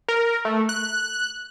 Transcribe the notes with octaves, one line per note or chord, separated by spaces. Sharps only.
A#4
A3
F#6